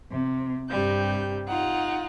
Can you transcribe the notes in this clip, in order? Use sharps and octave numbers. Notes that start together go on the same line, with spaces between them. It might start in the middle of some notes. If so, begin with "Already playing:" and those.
C3
G2 C3 G3 G6
D#4 F4 F#5